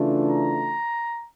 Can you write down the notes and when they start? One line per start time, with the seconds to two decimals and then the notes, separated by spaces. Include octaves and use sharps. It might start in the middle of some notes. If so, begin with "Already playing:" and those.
Already playing: C#3 E3 A3 D4 F4
0.31 A#5